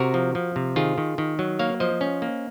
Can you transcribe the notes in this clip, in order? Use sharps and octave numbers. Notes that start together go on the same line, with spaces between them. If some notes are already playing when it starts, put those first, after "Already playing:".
Already playing: C3 F#4 A#4
F3
F3
C3
D#3 F4 G#4
D#3
D#3
F#3
A#3 C#5 F5
F3 C5 D#5
C#4
A#3